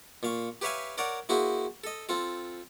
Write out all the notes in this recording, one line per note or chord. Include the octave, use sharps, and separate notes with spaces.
A#2 F5 C#6
G4 B4 C#5 E5 F5 G#5
A#4 C#5 D5 F#5
A#3 E4 F#4 G#4 C5
A4 D#5
C4 F4 A4